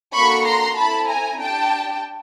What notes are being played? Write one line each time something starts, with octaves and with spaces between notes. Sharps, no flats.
A#3 D4 F#4 A4 B5 C#6
A#5 C6
C4 E4 A4 A5 B5
G#5 A#5
D4 G4 G5 A5